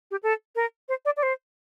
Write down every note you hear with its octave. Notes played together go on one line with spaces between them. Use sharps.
G4
A4
A#4
C5
D5
D5
C5